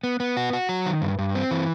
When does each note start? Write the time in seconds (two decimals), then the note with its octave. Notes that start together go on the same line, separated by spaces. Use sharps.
0.04 B3
0.20 B3
0.37 F#4
0.53 F#4
0.69 F#3
0.86 D#3
1.02 G2
1.18 G2
1.35 C4
1.51 E3